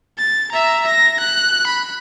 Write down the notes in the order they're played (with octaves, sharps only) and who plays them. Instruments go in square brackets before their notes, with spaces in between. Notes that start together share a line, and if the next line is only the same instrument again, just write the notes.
[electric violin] A6
E5 A#5
A#6
F#6
B5